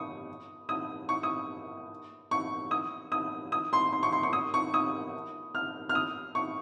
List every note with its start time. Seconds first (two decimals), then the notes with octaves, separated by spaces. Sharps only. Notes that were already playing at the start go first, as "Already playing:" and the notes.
Already playing: C#6 D#6
0.69 D#6
1.09 C#6
1.23 D#6
2.31 C#6
2.71 D#6
3.12 D#6
3.52 D#6
3.73 C6
3.93 C6
4.03 C#6
4.12 C6
4.23 C#6
4.33 D#6
4.54 C#6
4.74 D#6
5.55 F6
5.89 F6
5.95 D#6
6.35 C#6